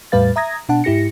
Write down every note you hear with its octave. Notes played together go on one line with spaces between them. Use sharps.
E2 A2 G3 B4 F5 A6
E5 A#5 D#6 G#6 A#6
B2 D4 F#5 A5
G#2 E4 G4 A#6 C#7